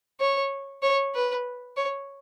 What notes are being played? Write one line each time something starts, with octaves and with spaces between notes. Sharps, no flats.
C#5
C#5
B4
C#5